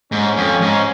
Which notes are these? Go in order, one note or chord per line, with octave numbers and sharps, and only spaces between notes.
G#2 C#4
F2
G#2